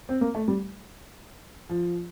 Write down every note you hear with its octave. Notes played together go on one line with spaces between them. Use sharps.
C4
A#3
A3
G3
F3